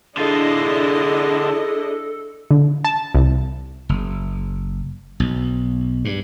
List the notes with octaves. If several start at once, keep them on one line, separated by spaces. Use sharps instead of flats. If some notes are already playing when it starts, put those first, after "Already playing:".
D3 D4 E4 F4 G#4 A4 D#5
D3
A5
C2
F#1
B1
G2